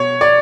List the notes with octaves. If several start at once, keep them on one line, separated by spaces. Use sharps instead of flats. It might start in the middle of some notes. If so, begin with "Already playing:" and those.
Already playing: B2 C#5
D5